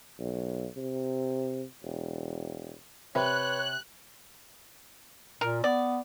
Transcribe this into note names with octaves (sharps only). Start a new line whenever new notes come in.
B1
C3
E1
C3 B4 C#5 F#6
A#2 A#4
B3 D5